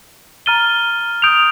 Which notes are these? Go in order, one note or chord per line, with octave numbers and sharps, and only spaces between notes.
A#5 F6 A6 D#7 G7
D#6 G6 D7 F7